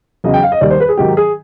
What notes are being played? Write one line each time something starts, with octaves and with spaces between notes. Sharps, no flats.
E2 C#3 F#3 D#5
G5
F5
D#5
D#2 D#3 G3 D5
C5
B4
G#4
G#2 D#3 F#3 G4
G#4